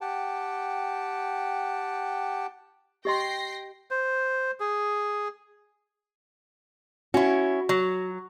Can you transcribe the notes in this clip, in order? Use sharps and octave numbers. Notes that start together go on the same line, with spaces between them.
G4 F#5 G5 A5
G4 D#5 G5 C6 A#6 C7
C5
G#4
C#4 E4 F#4
F#3